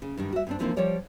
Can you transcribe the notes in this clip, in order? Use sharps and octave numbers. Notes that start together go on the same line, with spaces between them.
C#3
G2 D#3 G3
F#4 E5
G2 C4 D4
D3 E3 F3 A#3 C4 D#4
F3 G3 F4 C#5 D5